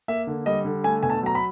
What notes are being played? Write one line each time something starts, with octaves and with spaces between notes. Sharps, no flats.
A#3 E5
D3
G3 D#5
D3
A3 G#5
B2 G#5
A5
F#3 A#5
B5